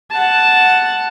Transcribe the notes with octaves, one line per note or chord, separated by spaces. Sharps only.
F#5 A5